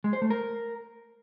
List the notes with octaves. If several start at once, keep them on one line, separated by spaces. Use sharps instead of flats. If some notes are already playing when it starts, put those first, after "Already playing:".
G#3
C5
A3
A#4